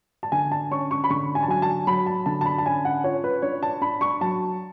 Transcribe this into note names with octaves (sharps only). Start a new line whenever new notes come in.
A5
D3 G#5
A5
C#4 C#6
C#6
B5
D3 C#6
G#5
A5
F#3 G#5
A5
F#3 B5
A5
D3 A5
A5
B5
A5
C#4 G#5
F#5
F4 C#5
B4
D4 C#5
A5
D4 B5
C#6
F#3 A5